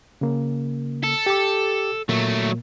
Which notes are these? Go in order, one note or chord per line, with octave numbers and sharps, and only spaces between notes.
C#3 A#3
A4
G4 D6
A#2 F#3 A3 A#3